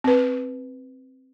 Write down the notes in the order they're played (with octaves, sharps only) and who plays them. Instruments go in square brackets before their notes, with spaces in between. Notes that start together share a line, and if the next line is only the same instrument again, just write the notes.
[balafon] C4 B4